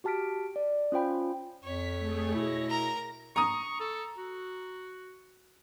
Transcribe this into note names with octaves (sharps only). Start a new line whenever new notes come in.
F#4 G4 A5 F6 B6 D7
D5
C#4 F4 C5 G5 B5
F2 C#5 B6
A3 G#4
B2 E4 A#6
A#4 A#5
A#5 C#6 D#6
A4
F#4